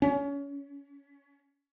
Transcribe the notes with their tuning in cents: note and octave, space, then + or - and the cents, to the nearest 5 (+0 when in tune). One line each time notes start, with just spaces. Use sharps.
C#4 +25